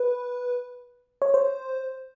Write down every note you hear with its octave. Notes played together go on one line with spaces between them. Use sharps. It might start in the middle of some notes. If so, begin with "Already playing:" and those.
Already playing: B4
C#5
C5